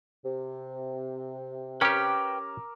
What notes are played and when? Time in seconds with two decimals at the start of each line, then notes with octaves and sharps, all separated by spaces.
0.25 C3
1.81 C#4 G4 A#4 B4 G5 D6 E6 F6